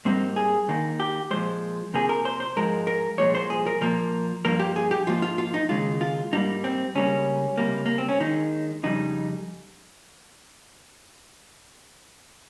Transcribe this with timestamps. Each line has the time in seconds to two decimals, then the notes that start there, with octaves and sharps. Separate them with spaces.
0.05 G#2 G3 A#3 C4
0.36 G#4
0.68 D#2 D#3 A#3
1.00 G4
1.31 A#2 F3 G#3 C5
1.94 F2 C3 F3 A#3 G#4
2.09 A#4
2.25 C5
2.40 C5
2.56 G#2 F3 G#3 A#4
2.87 A#4
3.18 C2 A#2 F3 G#3 C#5
3.35 C5
3.50 G#4
3.67 A#4
3.81 A#2 F3 A#3 A#4
4.45 G2 F3 A#3 A#4
4.59 G4
4.76 G#4
4.91 G4
5.07 G#2 F3 A#3 F4
5.22 F4
5.38 F4
5.54 D#4
5.69 D#2 C#3 G#3 F4
6.01 F4
6.32 G#2 G3 A#3 D#4
6.64 C4
6.95 C#2 C#3 G3 A#3 C#4
7.58 C#2 C3 G3 A#3
7.86 A#3
7.98 C4
8.09 C#4
8.20 D#2 D#3 G#3 D#4
8.83 F2 C#3 G3 D#4